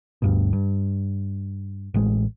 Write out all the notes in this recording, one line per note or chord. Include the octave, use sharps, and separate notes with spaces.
D2 G2 B2
G2
A1 G#3